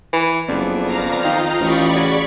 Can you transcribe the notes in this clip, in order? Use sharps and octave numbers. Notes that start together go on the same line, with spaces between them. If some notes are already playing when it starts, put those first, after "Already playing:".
E3
F#1 F2 B3 D5
F5 A#5
D#3 F4 D#5 G5
A1 D5 B5 C#6
C#3 F#4 G#4